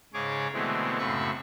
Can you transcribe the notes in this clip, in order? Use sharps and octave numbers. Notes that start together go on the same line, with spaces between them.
G#2 C#3 G#4 C#5 D6
B2 D3 E3 G#3 A3 C4
F#2 A2 C#3 C4 B5 C#6